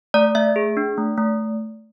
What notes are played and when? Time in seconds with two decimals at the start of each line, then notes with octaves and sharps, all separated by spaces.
0.14 A3 D5
0.35 A3 E5
0.56 G#4
0.77 D4
0.97 A3
1.18 A3